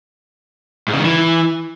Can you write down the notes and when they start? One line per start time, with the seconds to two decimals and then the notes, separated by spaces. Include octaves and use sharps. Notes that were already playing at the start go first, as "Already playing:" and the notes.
0.88 G#2
0.94 C#3
0.99 D#3
1.05 E3